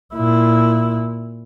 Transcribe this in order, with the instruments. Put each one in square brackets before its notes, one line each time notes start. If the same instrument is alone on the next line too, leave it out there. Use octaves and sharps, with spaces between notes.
[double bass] A#2 E4